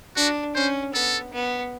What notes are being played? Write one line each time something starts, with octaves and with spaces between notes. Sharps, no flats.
D4 F#4
C#4 C5
B3 A4
B3